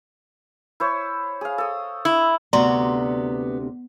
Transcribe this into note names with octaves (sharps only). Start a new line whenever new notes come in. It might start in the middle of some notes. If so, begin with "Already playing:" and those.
E4 C5 C#5
G#4 F5
A4 D#6
E4
D2 C3 B3 F#4 D5 A#5 C6